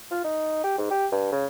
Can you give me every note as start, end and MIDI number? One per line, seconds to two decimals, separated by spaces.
0.11 0.21 65
0.24 0.61 63
0.64 0.76 67
0.78 0.86 44
0.91 1.06 67
1.12 1.29 43
1.32 1.46 49